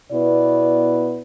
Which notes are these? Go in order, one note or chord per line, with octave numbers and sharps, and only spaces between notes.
B2 B3 E4 B4 D5